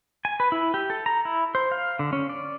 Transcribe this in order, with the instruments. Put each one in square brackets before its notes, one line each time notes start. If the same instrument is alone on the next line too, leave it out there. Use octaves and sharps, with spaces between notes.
[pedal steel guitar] G#5
B4
E4
G4
A4
A#5
E4
C5
F5
D3
C#4
D5